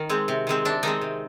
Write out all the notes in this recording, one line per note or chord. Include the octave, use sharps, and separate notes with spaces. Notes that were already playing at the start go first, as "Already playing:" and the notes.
Already playing: D#3
G#3 C4
C3
D#3 G#3 C4
C3 D4
D#3 G#3 C4 D#4
C3